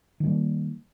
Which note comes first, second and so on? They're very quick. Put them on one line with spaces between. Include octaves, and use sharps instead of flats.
D#3 G3 A#3